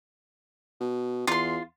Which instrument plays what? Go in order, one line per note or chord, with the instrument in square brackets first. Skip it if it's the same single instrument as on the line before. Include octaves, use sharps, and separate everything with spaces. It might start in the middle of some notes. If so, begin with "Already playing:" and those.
[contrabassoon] B2
[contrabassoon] E2 [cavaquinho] F4 C6